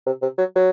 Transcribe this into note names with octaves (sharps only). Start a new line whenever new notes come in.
C3
C3
F#3
F#3